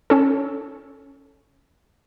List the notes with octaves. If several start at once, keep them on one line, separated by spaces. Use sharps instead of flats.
C#4 A4